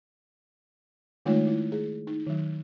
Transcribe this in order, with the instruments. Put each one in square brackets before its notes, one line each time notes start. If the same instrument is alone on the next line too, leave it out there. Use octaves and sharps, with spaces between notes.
[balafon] D#3 G#3 A3 D#4 F4 C#5
E4
G#4
D#4
D#3 F#3